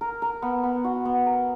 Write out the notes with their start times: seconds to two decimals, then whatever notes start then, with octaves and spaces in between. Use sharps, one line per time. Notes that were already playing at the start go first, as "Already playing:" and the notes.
0.01 A#4
0.22 A#4
0.42 B3
0.63 B3
0.84 F#4
1.05 B3
1.26 A#4